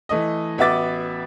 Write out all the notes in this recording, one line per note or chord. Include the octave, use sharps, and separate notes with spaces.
E3 A3 D#5
A1 B3 F#4 E5 D6 A6